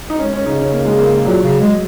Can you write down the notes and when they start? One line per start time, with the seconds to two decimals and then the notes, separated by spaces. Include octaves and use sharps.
0.10 D#4
0.19 G#3 C#4
0.33 C#4
0.46 C#3 D#4
0.59 C#4
0.72 A#3
0.85 G#3
0.98 A#3
1.25 A#2 F#3
1.43 C#3
1.60 G#3